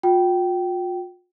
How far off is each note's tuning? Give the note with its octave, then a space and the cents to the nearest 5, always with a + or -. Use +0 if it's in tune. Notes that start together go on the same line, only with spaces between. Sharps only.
F4 +40 G5 -20